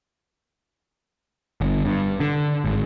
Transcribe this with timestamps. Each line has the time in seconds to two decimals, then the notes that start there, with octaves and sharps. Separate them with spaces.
1.61 G1
1.86 G2
2.20 D3
2.65 G#1